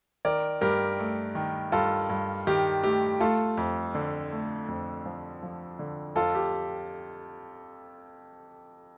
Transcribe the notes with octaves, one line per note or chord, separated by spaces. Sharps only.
D#3 A#4 D5
G2 G4 A#4
A3
D#3
G2 F4 A4
G2
D#3 G4
A3 G4
A3 F4 A4
F2
D3
A3
F2
F3
F3
D3
F2 F4 A4
G4